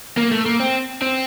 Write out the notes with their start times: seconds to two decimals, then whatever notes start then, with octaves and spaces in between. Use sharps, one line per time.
0.17 A#3
0.31 A3
0.46 A#3
0.60 C4
1.02 C4